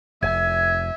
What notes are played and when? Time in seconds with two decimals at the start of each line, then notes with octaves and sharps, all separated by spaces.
0.22 F1 E5 G#5